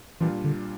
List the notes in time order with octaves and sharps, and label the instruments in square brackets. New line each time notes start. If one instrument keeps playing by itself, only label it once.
[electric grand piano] A#2 G3 D4 F4 [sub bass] E3
[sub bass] D3